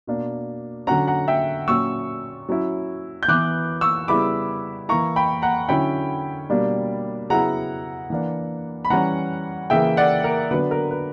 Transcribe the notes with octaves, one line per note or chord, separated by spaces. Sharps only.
B2 A#3 D4
D3 F#3 C#4 F#5 A#5
F#5 A#5
E5 G5
A#2 F#3 C#4 C#6 E6
F#3 C#4 E4
G6
E3 B3 E4 D6 F#6
C#6 E6
C#3 G3 B3 E4 B5 D6
E3 A#3 E4 A#5 C#6
G5 B5
F#5 A#5
D3 F#3 C#4 E4 G5 B5
B2 G3 A#3 D4
C#3 F#3 B3 E4 F#5 A#5
E3 A#3 D4
B5
E3 G3 C#4 F#5 A#5
C#3 E3 A#3 E5 G5
D5 F#5
A#4
D3 F#3 B3 D4 B4
A#4
B4